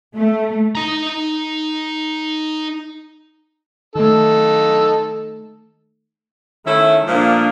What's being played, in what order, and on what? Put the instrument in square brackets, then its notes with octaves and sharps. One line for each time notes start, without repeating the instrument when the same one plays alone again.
[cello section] A3
[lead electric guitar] D#4 A#5
[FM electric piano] D#3 A3 [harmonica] D#4 A4
[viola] D#3 [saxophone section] A3 C#4 E4
[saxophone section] A#2 F3 [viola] A#3 D4